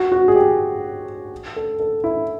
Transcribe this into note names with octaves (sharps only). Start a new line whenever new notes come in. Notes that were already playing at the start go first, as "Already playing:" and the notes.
Already playing: F#4
F#4
G#4
G4
A4
A4
E4